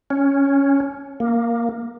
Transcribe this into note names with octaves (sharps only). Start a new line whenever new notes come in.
C#4
A#3